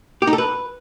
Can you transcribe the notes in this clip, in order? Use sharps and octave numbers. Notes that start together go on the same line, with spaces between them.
G4
D#4
A4
B4